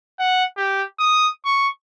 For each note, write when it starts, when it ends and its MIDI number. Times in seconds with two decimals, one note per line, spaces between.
0.19 0.44 78
0.57 0.83 67
0.99 1.29 87
1.45 1.68 85